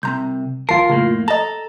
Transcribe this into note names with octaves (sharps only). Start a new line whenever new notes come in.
C2 C3 A#5 C6 G6
G#1 F4 A#4 A5 C7
F2 A2 C#3 A#3
A4 D#5 A5 A#5